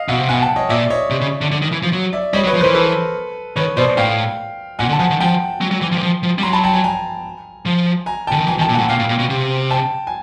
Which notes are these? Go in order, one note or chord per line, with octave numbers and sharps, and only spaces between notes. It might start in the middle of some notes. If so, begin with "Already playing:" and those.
Already playing: D#5 F5
B2 E5 F#5
C3
B2 F#5 G#5
G5 A5
C#5 D#5
A#2 D5 E5
C#5 D#5
C3
C#3
D3
D3
D#3
E3
F3
F#3
D5 E5
G3 C#5 D#5
F#3
B4 C#5
F3
E3 A#4 C5
A4 B4
D#3 B4 C#5
B2 C5 D5
A2 F5 G5
A#2 F#5 G#5
D3
A5
F3 F#5 G#5
D#3
F3 G5 A5
F#3
F#3
E3
F3
E3
F3
F3
G3
F#3 A#5 C6
A5 B5
G5 A5
G#5 A#5
G#5 A#5
F3
G#5 A#5
D3 G5 A5
D#3
E3 G#5 A#5
D#3
G5 A5
A#2
A2 F#5 G#5
A#2 F5 G5
A2
A#2
B2
C3
G5 A5
G#5